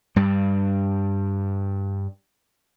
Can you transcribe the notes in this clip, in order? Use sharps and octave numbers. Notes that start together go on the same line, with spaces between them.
G2 G3